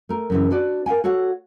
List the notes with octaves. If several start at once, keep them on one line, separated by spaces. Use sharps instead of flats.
A3 A#4
F#2 C#3 E3
D4 F#4 B4 D5
A#4 F5 G5 G#5
F#4 A4 C#5 F5 F#5